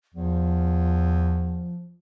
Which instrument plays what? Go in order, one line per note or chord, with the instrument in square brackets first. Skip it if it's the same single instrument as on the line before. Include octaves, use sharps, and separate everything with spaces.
[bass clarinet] E2 [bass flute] F3